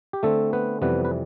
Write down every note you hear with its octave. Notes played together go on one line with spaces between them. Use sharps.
G4
D3 A3 C4 A4
B3 B4
F2 C3 E3 G3 B3 B4
B4